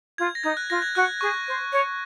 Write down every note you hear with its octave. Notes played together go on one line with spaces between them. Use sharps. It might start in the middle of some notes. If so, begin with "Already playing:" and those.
F4 G#6
A#6
D#4 G#6
F#6
F4 A#6
G#6
F#4 F#6
G#4 C#6
C5
C#5